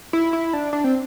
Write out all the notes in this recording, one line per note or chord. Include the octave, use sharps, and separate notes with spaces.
E4
E4
D4
D4
C4